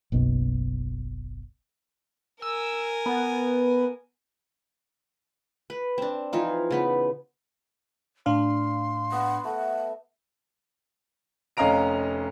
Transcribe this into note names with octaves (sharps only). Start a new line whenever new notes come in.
F#1 B1 B2
A#4 G#5 E6
B3
B4
C4 D4
E3 F3 D#4 F4
C#3 B3
A2 D4 F5 C6
B3 F#5
A3 F#5
F1 C#4 D#5 F5 A#5 D7